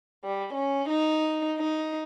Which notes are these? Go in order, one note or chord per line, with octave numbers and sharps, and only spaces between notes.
G3
C#4
D#4
D#4